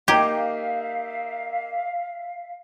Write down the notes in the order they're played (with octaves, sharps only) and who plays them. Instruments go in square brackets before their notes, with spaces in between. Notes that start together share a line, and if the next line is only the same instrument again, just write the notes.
[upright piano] A#3 D#4 [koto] G4 [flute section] E5 F5 [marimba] G5 A#5 G#6